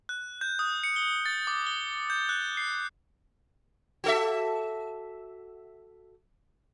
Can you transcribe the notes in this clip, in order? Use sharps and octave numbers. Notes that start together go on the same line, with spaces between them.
F#6
G6
D#6
C#7
G7
A6
D6
G7
G6
F#6
C7
F#4 A4 E5